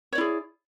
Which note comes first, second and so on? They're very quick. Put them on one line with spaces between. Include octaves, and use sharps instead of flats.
C#5 D5 E4 G#4